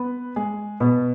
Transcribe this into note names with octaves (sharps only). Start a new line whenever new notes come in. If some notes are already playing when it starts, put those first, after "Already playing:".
Already playing: B3 B4
G#3 G#4
B2 B3